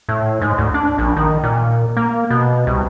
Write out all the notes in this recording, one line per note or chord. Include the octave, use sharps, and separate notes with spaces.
A2
G#2
D2
D4
A#1
D#3
A#2
A#3
B2
C2